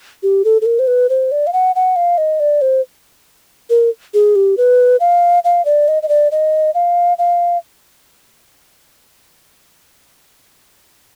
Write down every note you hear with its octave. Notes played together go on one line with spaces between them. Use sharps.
G4
A4
A4
A#4
C5
B4
C5
D5
F5
F#5
F#5
F5
D#5
D5
C5
A#4
G#4
G4
B4
F5
F5
D5
D#5
D#5
D5
D#5
F5
F5